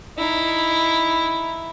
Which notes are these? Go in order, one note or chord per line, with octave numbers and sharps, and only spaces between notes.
D#4 E4